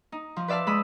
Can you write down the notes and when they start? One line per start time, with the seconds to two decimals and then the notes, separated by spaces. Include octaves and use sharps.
0.12 D#4
0.36 F3
0.48 B4 D5 E5 F5 A5
0.67 G#3 B5 D#6 E6